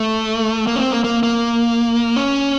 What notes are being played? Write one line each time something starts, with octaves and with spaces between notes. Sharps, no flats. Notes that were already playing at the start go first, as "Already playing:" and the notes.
Already playing: A3
A#3
C#4
C4
A#3
A#3
A#3
C#4